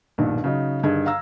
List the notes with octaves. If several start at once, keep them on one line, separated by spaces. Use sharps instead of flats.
A#1 G2 B2 D#3
C#3 F#3 D#4
G2 D3 D#3 G#4 D#5 G#6
F5 A#5 E6 A#6